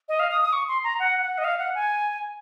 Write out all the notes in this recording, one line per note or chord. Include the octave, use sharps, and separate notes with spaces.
D#5
F5
D#6
D#6
C#6
C6
A#5
F#5
F#5
D#5
F5
F#5
G#5